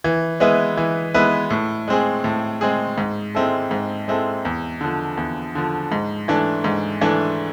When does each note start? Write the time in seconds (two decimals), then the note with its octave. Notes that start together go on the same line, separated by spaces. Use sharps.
0.04 E3
0.40 G#3 B3 E4 B4
0.77 E3
1.14 G#3 B3 E4 B4
1.50 A2
1.88 G#3 C4 G#4
2.24 A2
2.61 G#3 C4 G#4
2.98 G#2
3.35 G#3 C4 E4 A4
3.71 G#2
4.08 G#3 C4 E4 A4
4.45 E2
4.81 D3 F3
5.17 E2
5.55 D3 F3
5.92 G#2
6.28 E3 A3 D4
6.64 G#2
7.01 E3 A3 D4